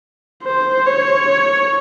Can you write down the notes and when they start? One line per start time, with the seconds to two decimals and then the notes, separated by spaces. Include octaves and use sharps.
0.44 C5
0.86 C#5